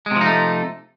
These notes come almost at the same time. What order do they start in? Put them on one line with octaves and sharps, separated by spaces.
G#3 C3 F3 D#4 A3